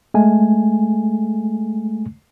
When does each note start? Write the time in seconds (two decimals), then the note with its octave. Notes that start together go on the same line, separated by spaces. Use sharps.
0.14 G#3 A3 G#5